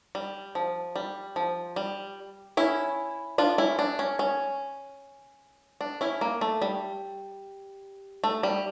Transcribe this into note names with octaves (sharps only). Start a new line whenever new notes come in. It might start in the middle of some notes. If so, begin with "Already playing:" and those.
G3
F3
G3
F3
G3
C#4 E4
D4 F4
C#4 E4
D4
C#4
C#4
D4
C#4 E4
A#3
A3
G3
A3
G3